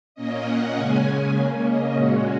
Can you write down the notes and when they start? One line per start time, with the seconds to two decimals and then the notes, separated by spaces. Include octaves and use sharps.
0.15 A#2 A#3 C#4 D#5
0.45 F#5
0.74 C#3 G#3 C#4 G#5
1.34 C#3 A#3 C#4
1.64 D#5
1.93 A#2 G#3 C#4 F#4